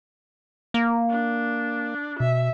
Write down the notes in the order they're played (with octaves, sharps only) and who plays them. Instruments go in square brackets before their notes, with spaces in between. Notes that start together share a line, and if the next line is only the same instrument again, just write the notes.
[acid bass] A#3
[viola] D4
[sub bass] B2 [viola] E5